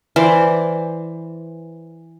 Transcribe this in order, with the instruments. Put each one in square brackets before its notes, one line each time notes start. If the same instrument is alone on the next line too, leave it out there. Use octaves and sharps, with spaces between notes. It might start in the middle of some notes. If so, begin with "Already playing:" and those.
[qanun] E3 C5 D5